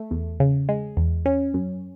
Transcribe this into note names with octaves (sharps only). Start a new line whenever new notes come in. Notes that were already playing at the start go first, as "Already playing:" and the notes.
Already playing: A3
E2
C#3
G#3
E2
C#4
F#2